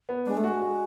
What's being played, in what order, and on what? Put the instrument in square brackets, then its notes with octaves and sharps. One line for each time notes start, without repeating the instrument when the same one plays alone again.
[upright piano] B3
[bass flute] G#3 [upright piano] D4
[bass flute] A3
[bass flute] G#3 [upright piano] F#4
[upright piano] F#4